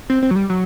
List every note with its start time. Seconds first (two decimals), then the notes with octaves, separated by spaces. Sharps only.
0.10 C4
0.22 C4
0.31 F#3
0.36 G3
0.50 F#3